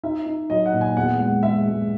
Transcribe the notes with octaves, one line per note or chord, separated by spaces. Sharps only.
D#4 E5
D#4
F#3 D#5
F#5
A#2
G#5
E2 F#5
G#3 F#5
G#3 E5
G#3